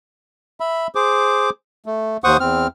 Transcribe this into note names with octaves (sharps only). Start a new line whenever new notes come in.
E5 B5
G#4 C5 D6
A3
D#2 C5 F#5 C#6 D#6
E2 C4 F6